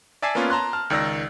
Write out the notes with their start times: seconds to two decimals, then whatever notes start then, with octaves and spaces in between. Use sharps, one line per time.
0.22 D5 E5 G#5 A5 D6 C7
0.35 A#3 B3 C#4 F4
0.50 A5 A#5 C6 F#6
0.73 A5 F6
0.90 C#2 D#3 D5 E6 A#6